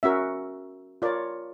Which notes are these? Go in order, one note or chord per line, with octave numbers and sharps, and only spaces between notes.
C#4 F#4 A#4 E5
F4 A#4 C#5 D5